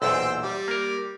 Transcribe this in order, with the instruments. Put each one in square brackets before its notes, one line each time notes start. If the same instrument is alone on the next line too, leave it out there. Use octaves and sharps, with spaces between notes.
[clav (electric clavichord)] B1 E2 A#2 [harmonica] C5 G5 E6
[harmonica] G3
[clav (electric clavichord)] A#3 A#4